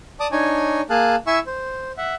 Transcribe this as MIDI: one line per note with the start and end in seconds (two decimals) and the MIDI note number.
0.20 0.27 74
0.20 0.27 81
0.20 0.27 86
0.20 0.27 87
0.32 0.81 62
0.32 0.81 63
0.32 0.81 73
0.32 0.81 80
0.90 1.16 58
0.90 1.16 68
0.90 1.16 77
0.90 1.16 81
0.90 1.16 90
1.27 1.39 64
1.27 1.39 76
1.27 1.39 80
1.27 1.39 85
1.27 1.39 88
1.46 1.92 72
1.98 2.15 76
1.98 2.15 78